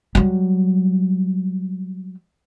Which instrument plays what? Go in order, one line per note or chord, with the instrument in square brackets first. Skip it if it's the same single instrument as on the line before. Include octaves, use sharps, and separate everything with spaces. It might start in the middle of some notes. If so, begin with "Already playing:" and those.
[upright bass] F#3 G3